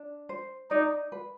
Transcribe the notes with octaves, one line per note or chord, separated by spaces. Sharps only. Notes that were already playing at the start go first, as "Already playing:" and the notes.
Already playing: D4
C5
D#4 D5
B4